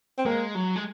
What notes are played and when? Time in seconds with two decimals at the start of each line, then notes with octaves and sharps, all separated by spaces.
0.18 C4
0.26 G#3 A#3
0.55 F#3
0.76 G#3